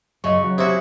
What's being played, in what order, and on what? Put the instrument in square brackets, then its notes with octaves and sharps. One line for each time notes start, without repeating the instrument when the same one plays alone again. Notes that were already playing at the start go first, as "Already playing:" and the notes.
[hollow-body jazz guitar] F#2 D#5 [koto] C#3 [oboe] C#6
[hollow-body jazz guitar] F#3
[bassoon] C3 [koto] E4 F#4 [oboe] G#4